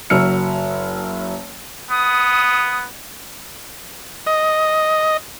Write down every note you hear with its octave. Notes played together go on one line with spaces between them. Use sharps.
F#1 F#3 E6 F6 C#7
B3 D#6
D#5